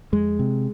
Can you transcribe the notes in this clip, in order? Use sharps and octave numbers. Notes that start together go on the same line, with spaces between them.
F2 G#3
C3